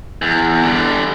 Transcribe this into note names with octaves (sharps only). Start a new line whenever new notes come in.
E2
D3 G3